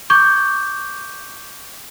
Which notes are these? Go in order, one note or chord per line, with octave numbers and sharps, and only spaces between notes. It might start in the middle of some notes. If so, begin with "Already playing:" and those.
C#6 D6 G6 G#6